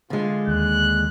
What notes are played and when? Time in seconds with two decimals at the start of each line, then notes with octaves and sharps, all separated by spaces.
0.10 D3 G#3 F4
0.47 D#2 F#6